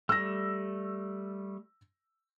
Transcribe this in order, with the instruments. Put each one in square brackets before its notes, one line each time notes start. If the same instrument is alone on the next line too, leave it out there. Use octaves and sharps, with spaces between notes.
[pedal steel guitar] G3 A3 [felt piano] E6 A#6